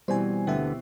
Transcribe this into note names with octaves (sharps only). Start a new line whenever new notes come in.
B2 E3 G3 C4 C5 G#5
D2 D3 B3 G4 E5